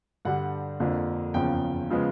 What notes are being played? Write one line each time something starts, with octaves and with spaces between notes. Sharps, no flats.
G2 D3 G3 F#5
F2 D3 F3 A#3
F#1 E2 C#3 F3 G5
C#3 F3 G#3 B3